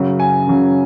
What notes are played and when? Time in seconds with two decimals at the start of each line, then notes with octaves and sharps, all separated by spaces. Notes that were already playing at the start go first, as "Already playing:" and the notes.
Already playing: F#2 C#3 F#3
0.20 G#5
0.47 F#2 C#3 F#3